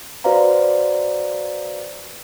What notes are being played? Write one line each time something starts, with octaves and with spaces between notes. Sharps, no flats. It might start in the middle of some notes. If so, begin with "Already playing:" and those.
F#4 B4 C5 D5 F5 A#5